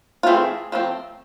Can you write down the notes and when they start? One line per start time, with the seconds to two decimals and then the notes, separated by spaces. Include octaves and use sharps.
0.23 F4
0.26 E3 A3 C4 G#4
0.72 F3 A3 C4